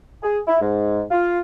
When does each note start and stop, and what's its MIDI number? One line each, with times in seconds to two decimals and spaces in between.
0.23 0.39 68
0.48 0.57 64
0.61 1.02 44
1.11 1.38 65